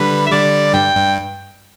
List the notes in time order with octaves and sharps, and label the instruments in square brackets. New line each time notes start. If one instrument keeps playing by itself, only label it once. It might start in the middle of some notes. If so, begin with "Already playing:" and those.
Already playing: [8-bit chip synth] D3 G3 [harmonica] B4
[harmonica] E5
[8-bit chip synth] D3 G3 [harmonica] D5
[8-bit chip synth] G2 [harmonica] G5
[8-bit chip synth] G2